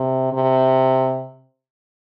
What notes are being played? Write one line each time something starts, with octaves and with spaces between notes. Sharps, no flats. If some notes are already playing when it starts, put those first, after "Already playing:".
Already playing: C3
C3